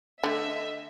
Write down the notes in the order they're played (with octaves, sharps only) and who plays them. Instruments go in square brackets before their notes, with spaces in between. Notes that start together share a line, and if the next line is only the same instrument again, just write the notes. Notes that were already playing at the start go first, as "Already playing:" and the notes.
[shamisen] D3 A3 [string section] D#5 E5